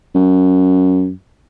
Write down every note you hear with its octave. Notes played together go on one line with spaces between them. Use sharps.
F#2